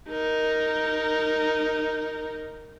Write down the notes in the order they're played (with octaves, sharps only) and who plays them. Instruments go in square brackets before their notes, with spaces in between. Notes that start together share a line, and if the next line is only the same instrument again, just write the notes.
[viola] D#4 A#4